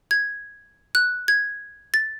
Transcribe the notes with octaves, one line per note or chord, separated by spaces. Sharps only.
G#6
F#6
G#6
A6